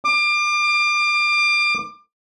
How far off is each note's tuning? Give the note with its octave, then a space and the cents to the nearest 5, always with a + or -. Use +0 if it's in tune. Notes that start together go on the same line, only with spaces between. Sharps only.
D6 +30